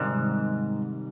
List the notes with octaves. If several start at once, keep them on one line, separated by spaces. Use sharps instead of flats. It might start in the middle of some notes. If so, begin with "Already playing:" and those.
Already playing: G#2 C3 D#3 G3